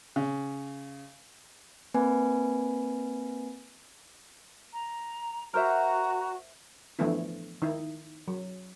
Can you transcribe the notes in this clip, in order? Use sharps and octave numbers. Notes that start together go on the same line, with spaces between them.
C#3
A#3 C4 B4 G#5
A#5
F#4 A#4 C5 E5 A#5
D3 E3 F3 A3 B3 E4
D#3 D#4 E4
F#3